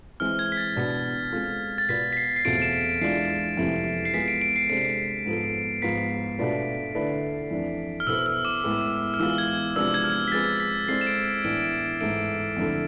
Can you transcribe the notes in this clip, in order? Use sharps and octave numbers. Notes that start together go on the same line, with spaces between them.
E3 G#3 C4 F6
G#6
B6
A6
B2 B3 D4
G#3 C4 F4 A4
A6
B2 B3 F4 B4 D5 B6
B6
C7
C7
E2 B2 A3 C4 F4 D7
E7
D7
E3 G#3 D4 F4 C7
F2 C3 E3 A3 E4
C7
G#3 B3 F4 G#4 B6
D7
D7
C7
C3 G#3 D4 A4 C5 C7
G#2 F3 B3 F4 A4
G#2 F3 B3 F4 B6
B2 A3 D4 F4 B4
D3 A3 E4 B4 D5
F2 E3 A3 D4
F6
B2 B3 E4 A4 C5 E6
F6
E6
D6
A2 G#3 B3 E4 G#4
F6
E3 G#3 B3 F4 G#4 E6
G#6
C3 F3 G#3 B3 D4 E6
G#6
F6
B6
F3 G#3 C4 G#4 B4 A6
B6
G#3 C4 E4 A4 D5 C7
E7
D7
D7
A2 E3 B3 D4 D7
G#2 E3 A3 D7
F2 D3 A3 E4 A4